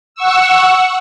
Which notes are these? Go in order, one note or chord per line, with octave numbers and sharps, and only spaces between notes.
F#5 C#6 E6